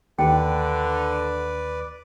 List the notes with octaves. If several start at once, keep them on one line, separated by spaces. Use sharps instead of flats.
D#2 D3 B4 D5 G5